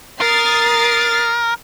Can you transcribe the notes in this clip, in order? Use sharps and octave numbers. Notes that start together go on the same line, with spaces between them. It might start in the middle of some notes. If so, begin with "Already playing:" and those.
A#4 D#6 A6 C7